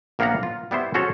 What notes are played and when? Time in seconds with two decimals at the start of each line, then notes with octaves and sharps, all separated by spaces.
0.19 A#1 A#3 B3 F5 F#5 A#5
0.43 F4
0.71 G3 B3 E4 C5
0.94 C#4 F#4 G#4 A4 C5 C#5